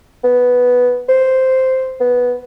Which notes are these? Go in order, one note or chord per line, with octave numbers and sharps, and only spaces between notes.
B3
C5
B3